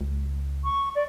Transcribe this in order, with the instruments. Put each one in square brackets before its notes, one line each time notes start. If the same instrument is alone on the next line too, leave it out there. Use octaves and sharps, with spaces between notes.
[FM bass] C#2
[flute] C#6
D5